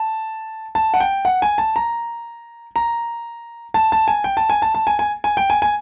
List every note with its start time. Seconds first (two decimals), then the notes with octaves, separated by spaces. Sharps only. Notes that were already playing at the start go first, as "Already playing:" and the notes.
Already playing: A5
0.75 A5
0.94 F#5
1.00 G5
1.25 F#5
1.42 G#5
1.58 A5
1.76 A#5
2.76 A#5
3.74 A5
3.92 A5
4.08 G#5
4.24 G5
4.37 A5
4.50 G#5
4.62 A5
4.75 A5
4.87 G#5
4.99 G#5
5.24 G#5
5.37 G5
5.50 G#5
5.62 G#5